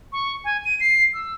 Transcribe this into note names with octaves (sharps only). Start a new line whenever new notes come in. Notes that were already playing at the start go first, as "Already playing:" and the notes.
C#6
G#5
D#7
C7
E6